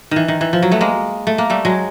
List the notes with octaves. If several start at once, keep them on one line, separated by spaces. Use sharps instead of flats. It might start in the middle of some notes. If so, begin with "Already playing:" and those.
D#3 E3
D#3
E3
F3
F#3
A3 B3
G#3 A#3
A3
A#3
G3 A3
F#3 G#3